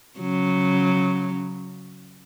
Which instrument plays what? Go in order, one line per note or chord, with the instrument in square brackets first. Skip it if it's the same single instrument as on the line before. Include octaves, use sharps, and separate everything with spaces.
[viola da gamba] C#3 F#3